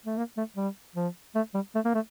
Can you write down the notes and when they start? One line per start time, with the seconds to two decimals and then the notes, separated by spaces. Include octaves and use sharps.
0.06 A3
0.17 A#3
0.37 A3
0.56 G3
0.96 F3
1.35 A3
1.54 G3
1.75 A3
1.85 A#3
1.95 A3